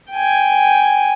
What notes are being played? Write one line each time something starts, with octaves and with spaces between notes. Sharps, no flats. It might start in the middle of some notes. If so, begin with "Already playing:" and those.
G5 G#5